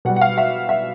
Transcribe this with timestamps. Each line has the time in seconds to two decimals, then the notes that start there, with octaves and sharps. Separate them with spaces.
0.05 B2 F#5
0.09 G3
0.16 F#5
0.21 F5
0.38 E5
0.69 E5